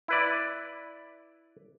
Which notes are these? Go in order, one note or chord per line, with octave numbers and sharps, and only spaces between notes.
E4 B4 D5